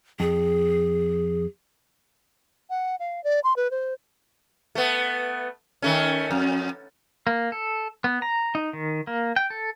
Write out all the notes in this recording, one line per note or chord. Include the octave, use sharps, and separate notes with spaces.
F2 G#4
F#5
F5
D5
C6
B4
C5
A3 B3
D#3 A3 C#4
F2
A#3
A4
B3
A#5
D#4
D#3
A#3
G5
A4